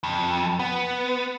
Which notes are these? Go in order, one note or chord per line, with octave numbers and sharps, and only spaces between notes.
F2
B3